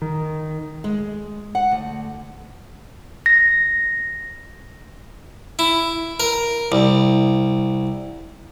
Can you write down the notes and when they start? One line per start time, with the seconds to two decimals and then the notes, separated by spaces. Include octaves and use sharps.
0.02 D#3
0.84 G#3
1.55 F#5
1.71 D2
3.26 A#6
5.59 E4
6.20 A#4
6.72 C2